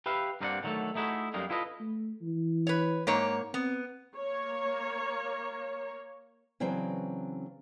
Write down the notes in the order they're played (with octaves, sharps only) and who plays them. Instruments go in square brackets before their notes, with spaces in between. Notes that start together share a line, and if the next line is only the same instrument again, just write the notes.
[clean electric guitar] G4 B4 E5 F5
G2 A#3 C4 B4 D5 F#5
D3 D#3 F#3 G#3 A3 A4
A3 D#4 E4 F#4 G#4
F#2 G3 G#3 A#3 D#4
E4 F4 A4 B4 D#5
[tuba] A3
E3
[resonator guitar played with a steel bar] B4 C#5
G#2 A#3 C#5
[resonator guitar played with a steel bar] B3 [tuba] C4
[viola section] A#3 C#5
[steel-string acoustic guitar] C#3 E3 F#3 C4 D4